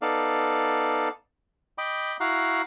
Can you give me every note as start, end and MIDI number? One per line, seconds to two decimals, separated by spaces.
0.02 1.09 59
0.02 1.09 63
0.02 1.09 69
0.02 1.09 74
0.02 1.09 77
1.78 2.17 75
1.78 2.17 79
1.78 2.17 83
1.78 2.17 86
2.20 2.62 64
2.20 2.62 66
2.20 2.62 77
2.20 2.62 82
2.20 2.62 90